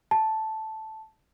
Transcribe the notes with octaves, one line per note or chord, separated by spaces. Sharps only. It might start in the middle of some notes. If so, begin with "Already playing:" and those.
A5